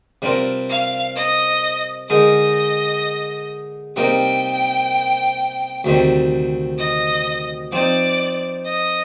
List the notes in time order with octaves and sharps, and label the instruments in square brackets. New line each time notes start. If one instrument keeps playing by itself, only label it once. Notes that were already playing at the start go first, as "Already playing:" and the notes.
[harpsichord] C3 G3 D4 F4 A#4
[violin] F5
D#5
[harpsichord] D3 G#3 D#4 A#4 [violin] D#5
[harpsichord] C3 G3 A#3 D#4 A#4 [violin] G5
[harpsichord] D2 C3 D#3 G3
[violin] D#5
[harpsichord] F3 C4 D#4 [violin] D5
[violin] D#5